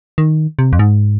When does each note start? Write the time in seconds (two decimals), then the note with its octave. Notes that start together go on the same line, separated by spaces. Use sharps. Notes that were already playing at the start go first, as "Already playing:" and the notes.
0.18 D#3
0.59 C3
0.73 F2
0.79 G#2